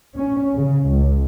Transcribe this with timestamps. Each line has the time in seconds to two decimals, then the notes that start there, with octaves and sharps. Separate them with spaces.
0.16 C#4
0.54 C#3
0.90 C#2